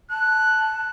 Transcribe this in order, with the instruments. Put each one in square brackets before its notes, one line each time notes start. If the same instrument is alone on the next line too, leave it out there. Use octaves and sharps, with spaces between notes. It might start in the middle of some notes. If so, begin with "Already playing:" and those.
[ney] A5 [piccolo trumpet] F#6